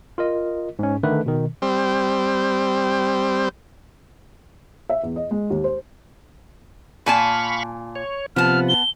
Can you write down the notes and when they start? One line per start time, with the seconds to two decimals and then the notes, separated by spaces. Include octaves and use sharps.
0.18 F4 A#4 D#5
0.79 G#2 C#4
1.03 D3 D#3 A3 B4
1.26 B2 D#3
1.62 G3 C4
4.89 E5
5.03 E2
5.16 D#5
5.31 G#3
5.50 D#2
5.64 C5
7.06 A#2 F5 G#5 A5 B5 C#6
7.95 C#5
8.36 C3 F3 B3 A5 F6
8.69 G7